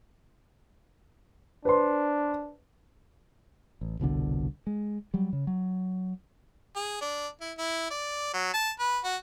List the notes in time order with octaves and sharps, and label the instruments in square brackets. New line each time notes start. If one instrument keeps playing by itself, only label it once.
[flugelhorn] D4 [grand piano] B4 C5 C6
[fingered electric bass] A1
G1 C2 B2 D3
G#3
F#3 G3
C#3
F#3
[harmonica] G#4
D4
E4
E4
D5
F#3
A5
B4
F#4